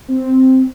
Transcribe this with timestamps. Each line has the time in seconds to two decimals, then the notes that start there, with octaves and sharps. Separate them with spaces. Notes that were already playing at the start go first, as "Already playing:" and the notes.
0.08 C4